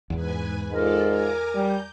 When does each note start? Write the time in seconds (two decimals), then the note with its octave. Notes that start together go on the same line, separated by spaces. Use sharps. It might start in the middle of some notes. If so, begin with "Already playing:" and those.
0.10 E2 G#2 B4 G#5
0.71 G#2 F4 A4 A#4 D5
1.07 G#5 A#5 D6
1.54 G3 G6